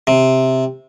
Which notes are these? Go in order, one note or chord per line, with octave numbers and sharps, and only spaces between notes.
C3